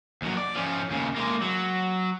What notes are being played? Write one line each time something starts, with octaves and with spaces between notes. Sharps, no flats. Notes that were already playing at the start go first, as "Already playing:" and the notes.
D#2 F#3
D5
F3 C#4
D#2 C#3
G#3 A#3
F#3